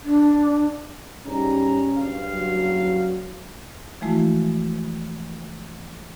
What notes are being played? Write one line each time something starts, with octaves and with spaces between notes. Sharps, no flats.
D4
G#2 G3 C#4 A#5
F#1 G2 F5
F#3
E3 F3 G#3 A3 E4 F#4